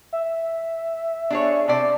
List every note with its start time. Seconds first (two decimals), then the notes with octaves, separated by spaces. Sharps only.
0.13 E5
1.30 D4 G#4 C#5
1.68 C3 C5 D5 A5